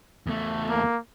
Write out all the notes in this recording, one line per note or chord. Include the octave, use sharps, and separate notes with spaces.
E2 A3
A#3